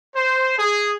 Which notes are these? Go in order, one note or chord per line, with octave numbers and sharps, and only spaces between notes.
C5
G#4